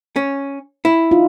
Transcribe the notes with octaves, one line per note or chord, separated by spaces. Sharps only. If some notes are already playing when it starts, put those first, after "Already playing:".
C#4
E4
D#4 F4